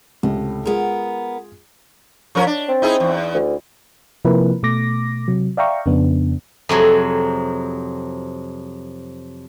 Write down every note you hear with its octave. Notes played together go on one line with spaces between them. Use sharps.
C#2 A2 C3
G#3 B3 F4 G#4 A#4
F3 C#4 A#4
D4
C4
D#4 E4 G#4
E2
D2
C3 F3 A#3 E4 A#4 B4
B2 A3 D6 A#6
C3 F#3
D5 E5 F5 G5 A#5 C#6
F2 C#3 B3 D4
F2 C3 F#3 G#4